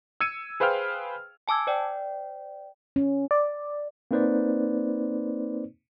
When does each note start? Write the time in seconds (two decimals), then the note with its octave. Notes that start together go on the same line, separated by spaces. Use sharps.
0.21 E6 G#6 C#7 D#7
0.60 G#4 B4 C5 F5 G5 F6
1.48 G#5 A5 D6 E6 G#6
1.67 C5 D5 G5
2.96 C#4
3.31 D5
4.11 A#3 C4 D#4 B4 C5 D5